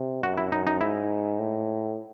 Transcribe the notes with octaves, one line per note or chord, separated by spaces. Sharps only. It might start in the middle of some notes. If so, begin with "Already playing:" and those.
Already playing: C3
F#2 F#4
E4
F#2 D#4
D#4
G#2 E4
A2